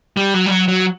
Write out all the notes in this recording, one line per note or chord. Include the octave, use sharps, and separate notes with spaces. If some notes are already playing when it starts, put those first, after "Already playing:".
G3
F#3
G3
F#3
F#3